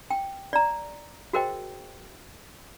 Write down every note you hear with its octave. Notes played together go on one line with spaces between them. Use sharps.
G5
D5 A#5
F#4 G#4 A#4 C5 D#5 G5